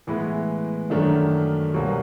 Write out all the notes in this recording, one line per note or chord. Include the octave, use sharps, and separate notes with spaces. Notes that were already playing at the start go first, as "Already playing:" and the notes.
A2 E3 G#3 B3 E4
F#2 D#3 F#3 A3 D4
C2 B2 F#3 A#3